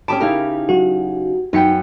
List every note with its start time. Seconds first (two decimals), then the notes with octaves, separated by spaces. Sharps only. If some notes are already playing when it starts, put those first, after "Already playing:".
0.08 C#4 G4 A5 B5 D6 D#6 D7
0.20 C#3 D#4 E4 G4 A#4
0.69 F#3 F#4
1.53 F#2 B3 D#4 G5 B5 C#7